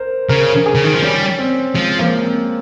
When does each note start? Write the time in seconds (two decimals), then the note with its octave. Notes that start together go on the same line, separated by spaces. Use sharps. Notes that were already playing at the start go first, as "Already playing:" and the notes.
Already playing: A#4 C5
0.29 C#3 A#4
0.66 G#4
0.75 C#3
0.84 D#3
0.93 F3
1.02 G3 C#4
1.39 C4
1.75 F3 G#3
1.99 A#3
2.23 C4